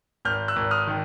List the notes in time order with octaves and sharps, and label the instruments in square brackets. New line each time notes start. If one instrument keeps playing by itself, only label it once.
[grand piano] G#1 F6 G6
E6 F#6
G#1
D#6 F6
D#3